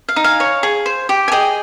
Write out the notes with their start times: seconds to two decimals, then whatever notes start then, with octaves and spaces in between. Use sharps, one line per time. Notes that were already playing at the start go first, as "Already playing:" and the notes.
0.09 F5
0.16 D#4
0.24 F5 G#5
0.40 C#5
0.63 G#4
0.86 C5
1.09 G4
1.28 G#5
1.32 G#4 D#5 G5